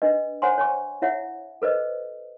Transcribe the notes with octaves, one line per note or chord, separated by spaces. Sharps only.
D4 B4 D#5
C5 C#5 F#5 G#5 C6
C#5 G#5 C#6
E4 C#5 E5 F#5
A4 B4 C5 D#5